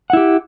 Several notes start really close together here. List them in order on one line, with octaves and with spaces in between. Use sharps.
F#5 E4 G4